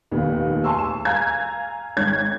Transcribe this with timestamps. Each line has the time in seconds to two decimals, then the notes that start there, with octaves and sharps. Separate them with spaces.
0.11 F1 D#2 A#2 B3
0.64 G#5 A5 C6 C#6 E6
0.79 E7
1.05 F5 G#5 A#5 G#6
1.97 G#1 C#5 G#6